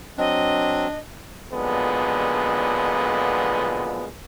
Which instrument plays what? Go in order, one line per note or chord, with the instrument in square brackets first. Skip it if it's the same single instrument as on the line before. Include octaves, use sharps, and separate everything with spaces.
[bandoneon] F#3 C4 [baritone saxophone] D4 [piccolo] D#5
[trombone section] B1 F2 A#2 D3 G#3 B3